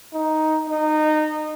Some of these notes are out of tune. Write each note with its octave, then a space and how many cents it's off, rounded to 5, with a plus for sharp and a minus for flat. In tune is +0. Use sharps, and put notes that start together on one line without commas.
D#4 +5
D#4 -20